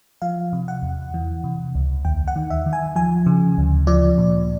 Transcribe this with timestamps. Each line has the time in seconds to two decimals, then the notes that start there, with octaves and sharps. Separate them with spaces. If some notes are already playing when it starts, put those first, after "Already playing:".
0.22 F3 F5
0.53 C3
0.68 F#5
0.82 E2
1.14 E3
1.44 C3
1.75 C#2
2.05 D#2 G5
2.28 F#5
2.36 D#3
2.50 E5
2.66 D#3
2.73 G#5
2.96 F3 G#5
3.26 C#3
3.58 D2
3.87 F3 D5
4.18 A#2